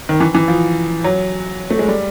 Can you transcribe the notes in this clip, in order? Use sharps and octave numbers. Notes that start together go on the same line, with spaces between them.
D#3
E3
E3
F3
F#3
A3
G#3
G3